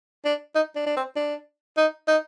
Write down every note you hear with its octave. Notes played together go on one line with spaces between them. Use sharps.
D4
D#4
D4
D4
C4
D4
D#4
D#4